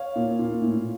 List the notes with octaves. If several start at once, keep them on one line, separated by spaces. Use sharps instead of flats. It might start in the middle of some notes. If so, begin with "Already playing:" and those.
Already playing: C#5 F5
A#2
A#2
A2